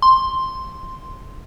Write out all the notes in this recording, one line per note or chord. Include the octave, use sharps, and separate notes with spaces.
C6